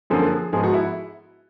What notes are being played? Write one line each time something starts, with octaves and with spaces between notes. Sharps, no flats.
F#2 D3 F3 A#3 G#4
G#2 F3 G#3 B3 G#4
F#4
E4